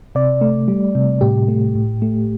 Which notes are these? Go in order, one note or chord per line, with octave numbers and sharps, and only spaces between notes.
C3 D5
A3
G3
C3
A2 G4
A3
A2
A3